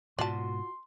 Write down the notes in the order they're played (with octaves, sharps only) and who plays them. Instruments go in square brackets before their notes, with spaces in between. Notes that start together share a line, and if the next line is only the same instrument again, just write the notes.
[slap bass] G#2 B2 [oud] F4 F#4 [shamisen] D5 A5 [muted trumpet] C6